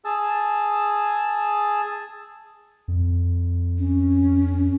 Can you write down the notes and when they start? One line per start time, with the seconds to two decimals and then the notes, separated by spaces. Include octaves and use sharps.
0.05 G#4 A5 E6
2.88 F2
3.78 C#4